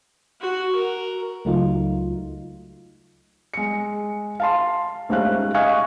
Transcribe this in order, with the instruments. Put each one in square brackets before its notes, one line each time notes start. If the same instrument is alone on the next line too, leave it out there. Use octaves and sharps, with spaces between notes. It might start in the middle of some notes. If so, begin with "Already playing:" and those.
[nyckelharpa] F#4
A#4
[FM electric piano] C#2 F#3 A3 D#4 F4
[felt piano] G#3 C#7
F5 A5 C6
D#1 G#2 A3 C#4 F5 F#6
D#5 F5 G#5 C#6 F#6 G#6